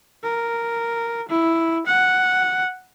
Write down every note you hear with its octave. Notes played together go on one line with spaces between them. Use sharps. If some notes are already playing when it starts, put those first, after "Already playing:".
A#4
E4
F#5